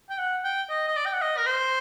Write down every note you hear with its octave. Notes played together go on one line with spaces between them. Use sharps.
G5
F#5
G5
D#5
D#5
D5
G5
F#5
D#5
A#4
C5